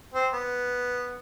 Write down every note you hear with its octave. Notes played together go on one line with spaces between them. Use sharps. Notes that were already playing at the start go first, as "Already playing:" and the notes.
C4
B3